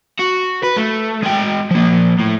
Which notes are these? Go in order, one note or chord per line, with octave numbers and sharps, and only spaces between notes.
F#4
B4
A3
G#3 G5
F3 A#3
A2